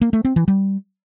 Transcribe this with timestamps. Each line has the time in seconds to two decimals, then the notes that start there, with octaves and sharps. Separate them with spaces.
0.01 A#3
0.13 A3
0.25 C4
0.36 E3
0.48 G3